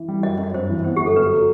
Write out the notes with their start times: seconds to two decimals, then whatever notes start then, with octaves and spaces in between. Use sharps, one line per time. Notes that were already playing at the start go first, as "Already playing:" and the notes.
Already playing: E3
0.08 G3
0.23 F#2 D#5
0.38 F#2
0.44 D#5
0.54 G2 C5
0.69 E3
0.84 B3 C5
0.97 G1 G4
1.06 A4
1.16 F#2 B4
1.32 F#3